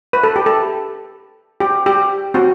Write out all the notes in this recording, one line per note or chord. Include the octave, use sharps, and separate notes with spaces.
B4
A4
G4
A4
G4
G4
C4 F#4